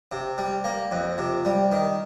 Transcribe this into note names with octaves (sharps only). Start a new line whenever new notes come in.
C3
G3
A#3
F2
C3
G3
D#3